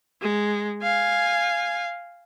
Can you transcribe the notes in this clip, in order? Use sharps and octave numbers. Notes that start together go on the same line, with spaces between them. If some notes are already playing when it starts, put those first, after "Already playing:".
G#3
F5 G#5